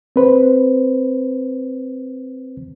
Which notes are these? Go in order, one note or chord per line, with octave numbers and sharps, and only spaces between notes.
C4 B4 C5